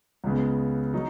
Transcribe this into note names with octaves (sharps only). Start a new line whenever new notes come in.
C#2 C#3 B3
F#3 D#4